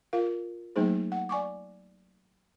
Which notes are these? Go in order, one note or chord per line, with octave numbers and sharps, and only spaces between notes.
F4 A#4 F5
F#3 A3 A#3 D#4 G#4 C5
F#5
D5 G#5 C#6 D6